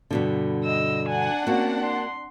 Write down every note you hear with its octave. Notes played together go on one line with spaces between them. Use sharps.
G2 B2 D3
D#5 E6
D4 F#5 G#5
A#3 C4 C#4 F#4
C6